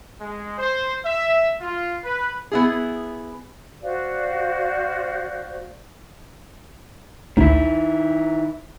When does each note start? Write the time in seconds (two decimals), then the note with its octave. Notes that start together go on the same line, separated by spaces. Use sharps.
0.19 G#3
0.58 C5
1.04 E5
1.60 F4
2.03 B4
2.52 B3 E4 G#4
3.83 F#4 C5 D5 F5
7.37 A1 D2 D#3 E4